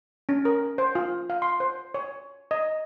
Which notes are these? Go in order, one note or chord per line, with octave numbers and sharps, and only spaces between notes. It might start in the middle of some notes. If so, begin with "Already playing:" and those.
C#4
A#4
C5
F4
F5
C6
C5
C#5
D#5